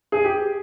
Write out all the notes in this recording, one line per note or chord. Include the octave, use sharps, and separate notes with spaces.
G#4
G4